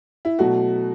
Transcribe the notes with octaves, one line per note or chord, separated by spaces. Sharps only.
E4
B2 F#3 A3 F#4